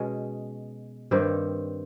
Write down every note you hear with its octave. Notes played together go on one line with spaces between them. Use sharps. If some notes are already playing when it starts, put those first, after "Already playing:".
Already playing: B2 G#3 C#4
G2 D#3 G3 C4